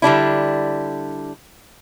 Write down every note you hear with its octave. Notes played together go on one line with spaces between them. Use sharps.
D3 G3 D4 E4